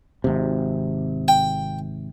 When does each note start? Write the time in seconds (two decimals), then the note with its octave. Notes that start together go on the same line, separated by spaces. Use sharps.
0.24 G#1 C3
1.28 G5